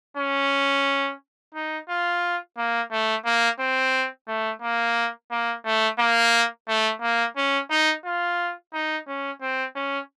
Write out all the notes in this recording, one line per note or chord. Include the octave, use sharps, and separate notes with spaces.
C#4
D#4
F4
A#3
A3
A#3
C4
A3
A#3
A#3
A3
A#3
A3
A#3
C#4
D#4
F4
D#4
C#4
C4
C#4